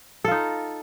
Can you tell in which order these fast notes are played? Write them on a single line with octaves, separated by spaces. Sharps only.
A4 F4 D#4